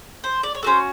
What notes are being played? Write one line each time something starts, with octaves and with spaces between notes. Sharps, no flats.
C5
D5
C#5
C#4 F#4 A4 C5